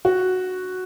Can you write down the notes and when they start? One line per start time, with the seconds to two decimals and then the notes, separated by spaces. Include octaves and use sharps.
0.05 F#4